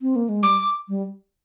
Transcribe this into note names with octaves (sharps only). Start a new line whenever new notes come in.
C4
A#3
G#3
G3 D6
G3